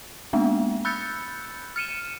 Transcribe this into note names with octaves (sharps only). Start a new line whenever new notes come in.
G#3 A#3 B3 D4
B5 E6 F#6 G6 A6 C#7
F6 C#7 D#7 E7